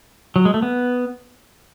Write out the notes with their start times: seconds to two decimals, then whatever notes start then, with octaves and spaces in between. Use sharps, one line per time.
0.36 F#3
0.45 G#3
0.54 A3
0.62 B3